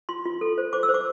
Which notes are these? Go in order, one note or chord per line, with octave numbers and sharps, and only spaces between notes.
F4 C6
F4
A4
C5
C5 D6
E6
C5
D6